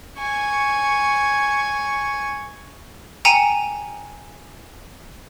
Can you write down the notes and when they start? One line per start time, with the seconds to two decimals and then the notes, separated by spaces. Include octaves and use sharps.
0.19 G#5 C#6
3.25 G5 G#5 A#5 C#7 D#7 E7